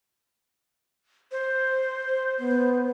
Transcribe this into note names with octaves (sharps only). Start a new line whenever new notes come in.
C5
B3